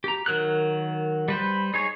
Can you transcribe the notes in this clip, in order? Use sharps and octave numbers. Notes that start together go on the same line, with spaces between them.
G4 A#5
D#3 F#3 A#4 F6 F#6
G3 B4 C5
D#4 G#4 C#5